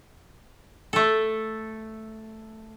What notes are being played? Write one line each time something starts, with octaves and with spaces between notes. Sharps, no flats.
A3 A4